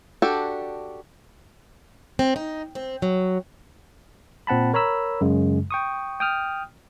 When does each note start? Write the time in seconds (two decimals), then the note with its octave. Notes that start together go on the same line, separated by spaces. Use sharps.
0.22 D4 F#4 G4 A4
2.19 C4
2.36 D#4
2.75 C4
3.02 F#3
4.47 A#2 C4 F#5 A5 B5
4.73 A#4 C#5 A#5 B5 E6
5.21 F#2 C#3 G#3
5.71 G5 C#6 D#6
6.20 G5 D#6 F6